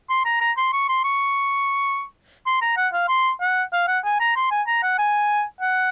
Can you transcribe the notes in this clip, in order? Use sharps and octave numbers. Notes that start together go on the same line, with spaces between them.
C6
A#5
A#5
C6
C#6
C6
C#6
C6
A#5
F#5
F5
C6
F#5
F5
F#5
G#5
A#5
C6
G#5
A#5
F#5
G#5
F#5